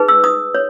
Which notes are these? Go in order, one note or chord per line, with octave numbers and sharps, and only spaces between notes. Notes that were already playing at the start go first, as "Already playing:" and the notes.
Already playing: D#4 G#4 B4
E6
D#6
C#5